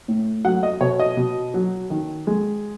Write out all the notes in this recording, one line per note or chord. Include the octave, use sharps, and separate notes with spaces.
A2
F#3 F#5
D#5
B2 C#5
D#5
B2
F#3
D#3
G#3